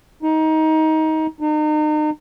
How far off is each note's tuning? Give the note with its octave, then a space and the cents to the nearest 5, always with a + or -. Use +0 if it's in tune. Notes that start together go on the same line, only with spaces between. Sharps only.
D#4 +20
D#4 -35